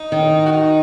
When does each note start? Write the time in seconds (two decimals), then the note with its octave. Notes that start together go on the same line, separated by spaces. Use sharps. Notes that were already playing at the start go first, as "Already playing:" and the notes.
Already playing: D#4
0.12 D#3
0.46 F#4
0.52 D#4